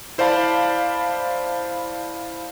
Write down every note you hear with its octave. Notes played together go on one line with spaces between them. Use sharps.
E4 C5 D5 F5 A5 B5